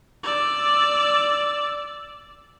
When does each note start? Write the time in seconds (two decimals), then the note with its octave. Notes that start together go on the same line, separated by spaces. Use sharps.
0.23 D5 E6